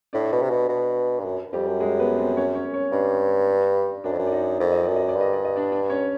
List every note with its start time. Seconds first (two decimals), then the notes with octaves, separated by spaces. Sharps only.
0.13 A2 D4 D5
0.32 B2
0.42 C3
0.50 B2
0.69 B2
1.19 G2
1.25 F#2
1.53 F2 G3 G4
1.67 F#2
1.80 G#3 G#4
1.99 B3 B4
2.18 C4 C5
2.36 C#4 C#5
2.55 C#4 C#5
2.74 C#4 C#5
2.92 G2 D4 D5
4.04 F#2 D4 D5
4.12 F2
4.19 F#2
4.27 D5
4.32 D#4 D#5
4.60 F2 D5
4.72 D#5
4.84 F#2 D5
4.96 D#5
5.09 D5
5.16 G2 D#5
5.33 D5
5.45 D#5
5.56 D4 D5
5.72 D4 D5
5.90 C#4 C#5